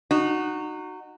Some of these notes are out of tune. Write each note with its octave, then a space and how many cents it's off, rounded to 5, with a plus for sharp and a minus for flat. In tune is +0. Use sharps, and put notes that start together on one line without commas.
D#4 -25 F#4 +0